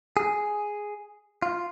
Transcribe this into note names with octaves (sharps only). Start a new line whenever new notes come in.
G#4
F4